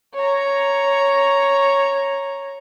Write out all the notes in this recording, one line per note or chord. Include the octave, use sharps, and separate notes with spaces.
C#5 A#5